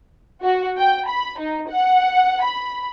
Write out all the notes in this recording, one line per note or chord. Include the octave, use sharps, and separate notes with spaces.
F#4
G5
B5
D#4
F#5
B5